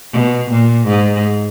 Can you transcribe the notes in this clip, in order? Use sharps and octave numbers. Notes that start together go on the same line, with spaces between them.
B2
A#2
G#2